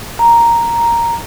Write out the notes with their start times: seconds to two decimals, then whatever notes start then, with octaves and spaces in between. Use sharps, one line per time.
0.19 A#5